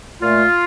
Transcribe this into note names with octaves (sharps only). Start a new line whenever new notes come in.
A#2 A3 F4